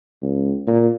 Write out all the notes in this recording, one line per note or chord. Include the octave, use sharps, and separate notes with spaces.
C#2
A#2